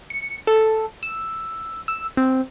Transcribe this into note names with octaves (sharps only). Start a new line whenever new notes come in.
C#7
A4
E6
E6
C4